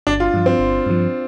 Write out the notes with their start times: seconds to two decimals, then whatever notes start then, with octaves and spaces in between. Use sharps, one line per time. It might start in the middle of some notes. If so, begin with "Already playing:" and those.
0.07 G1 D4
0.20 F4
0.34 G2 F3
0.46 C4
0.59 G1
0.86 G2 F3